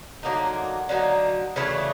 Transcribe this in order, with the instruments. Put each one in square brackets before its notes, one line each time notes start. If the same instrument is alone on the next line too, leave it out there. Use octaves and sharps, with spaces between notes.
[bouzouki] D3 F#3 A#3 D#4
D3 F#3 A#3 D#4
C#3 E3 A3 D4